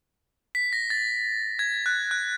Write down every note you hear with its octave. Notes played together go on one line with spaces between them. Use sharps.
B6
A#6
A6
G#6
F#6
F#6